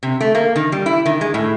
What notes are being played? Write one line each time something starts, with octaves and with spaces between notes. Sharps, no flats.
C3
A3
A#3
D#3
G3
E4
D#3
G#3
A2